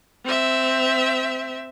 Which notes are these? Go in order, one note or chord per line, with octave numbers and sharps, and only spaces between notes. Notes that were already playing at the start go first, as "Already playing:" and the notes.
C4 E5